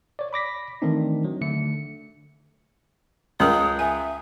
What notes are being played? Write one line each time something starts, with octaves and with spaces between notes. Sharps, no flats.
C#5 D5
B5 D6 A#6 B6
D#3 E3 A3 C4 D4 D#4
F#3
D3 A3 C#7
C#2 C#4 A#4 D#6
E5 G#5